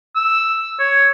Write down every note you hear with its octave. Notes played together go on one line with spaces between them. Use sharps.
E6
C#5